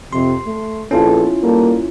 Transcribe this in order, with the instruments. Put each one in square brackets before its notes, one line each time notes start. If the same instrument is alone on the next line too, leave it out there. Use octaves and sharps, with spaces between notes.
[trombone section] F2 C3 [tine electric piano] C6
[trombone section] A3
[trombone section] A#1 B3 A4 [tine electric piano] C#4 E4 F4
[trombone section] G3 A#3 A4